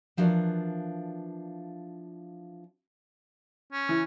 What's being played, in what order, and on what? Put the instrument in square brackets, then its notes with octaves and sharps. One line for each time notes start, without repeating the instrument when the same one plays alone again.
[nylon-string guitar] E3 F3 D4 F#4 A#4 D5
[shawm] C#4
[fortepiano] E3